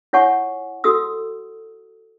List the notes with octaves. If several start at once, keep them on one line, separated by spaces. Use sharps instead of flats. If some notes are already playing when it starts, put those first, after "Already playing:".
E4 F4 C#5 F#5 G#5 C#6
F#4 A4 D#6 E6